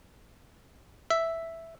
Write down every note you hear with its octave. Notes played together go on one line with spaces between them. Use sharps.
E5